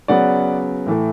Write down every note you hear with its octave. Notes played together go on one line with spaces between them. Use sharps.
C#3 F#3 B3 D5 F#5
A2 E3 A3